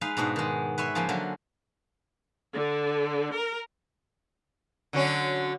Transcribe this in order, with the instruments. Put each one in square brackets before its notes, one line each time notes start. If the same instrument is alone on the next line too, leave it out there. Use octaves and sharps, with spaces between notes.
[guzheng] G#3 D#4 B4 F5
G#2 B2 D4 F#4
D#3 G#3
B4 C#5 E5 C6
C#3 F3 A#3 C5 G#5
D3 F#3 F4 E5
[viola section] D3
A#4
[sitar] D3 F#3 C#4